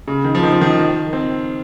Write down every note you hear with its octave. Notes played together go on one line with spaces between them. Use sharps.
C#3
D#3
F3
D#3
F3
D#3
F3
D#3
C4